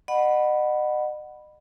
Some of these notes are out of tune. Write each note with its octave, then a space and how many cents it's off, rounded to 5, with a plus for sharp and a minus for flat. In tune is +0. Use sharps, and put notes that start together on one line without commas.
D#5 -40 F#5 +0 B5 +0